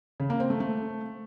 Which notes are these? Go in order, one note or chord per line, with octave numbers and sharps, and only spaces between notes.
C#3
A#3
C4
A3
A3